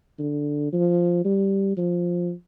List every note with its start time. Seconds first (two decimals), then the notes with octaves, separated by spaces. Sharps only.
0.19 D3
0.73 F3
1.25 G3
1.77 F3